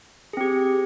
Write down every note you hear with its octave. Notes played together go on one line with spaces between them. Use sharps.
C4 G4 G#4